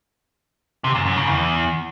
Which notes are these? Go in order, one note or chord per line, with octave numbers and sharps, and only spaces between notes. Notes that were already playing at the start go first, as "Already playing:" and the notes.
C3
F#2
F#2
C#3
E2